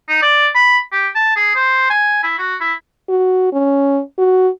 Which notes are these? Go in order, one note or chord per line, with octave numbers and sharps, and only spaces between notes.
D#4
D5
B5
G4
A5
G#4
C5
G#5
E4
F#4
E4
F#4
C#4
F#4